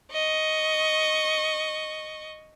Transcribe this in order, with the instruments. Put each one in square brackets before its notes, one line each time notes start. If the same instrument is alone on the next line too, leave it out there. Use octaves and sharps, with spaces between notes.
[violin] D#5 C#6